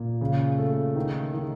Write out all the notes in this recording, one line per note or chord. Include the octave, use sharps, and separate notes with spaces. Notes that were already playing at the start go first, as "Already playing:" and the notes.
Already playing: A#2
C#3
A3
D#3
D#3